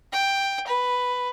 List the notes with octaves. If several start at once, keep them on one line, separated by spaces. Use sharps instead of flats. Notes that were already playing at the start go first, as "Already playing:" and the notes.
G5
B4